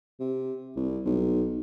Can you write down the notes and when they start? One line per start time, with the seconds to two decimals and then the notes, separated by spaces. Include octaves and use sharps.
0.20 C3
0.76 C2
1.06 B1